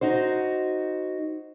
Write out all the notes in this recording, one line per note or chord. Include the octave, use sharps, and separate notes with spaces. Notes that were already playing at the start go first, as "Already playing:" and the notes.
D#4 F#4 C5